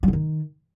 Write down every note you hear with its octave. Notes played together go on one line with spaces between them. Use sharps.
G3
D3
D#3